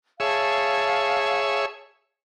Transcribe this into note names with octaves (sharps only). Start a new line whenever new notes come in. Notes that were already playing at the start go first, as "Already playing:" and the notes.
G#4 C#5 E5 F5 A5